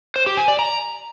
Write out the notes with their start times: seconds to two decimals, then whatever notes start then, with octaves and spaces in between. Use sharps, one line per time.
0.16 C5
0.26 G4
0.37 G#5
0.48 D5
0.59 A#5